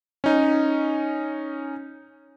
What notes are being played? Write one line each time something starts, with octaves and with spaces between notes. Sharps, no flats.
C#4 D#4